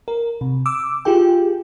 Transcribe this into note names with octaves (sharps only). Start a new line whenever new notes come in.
A#4
C3
D6 E6
F4 G4 G#4 G5